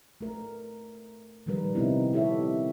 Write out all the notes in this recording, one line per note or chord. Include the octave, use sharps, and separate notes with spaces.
A3 A#4
A#2 D#3 F3 G3 A#4 B4
C3 D#3 B3 C4 D#4 E4
E4 G4 A4 C#5 E5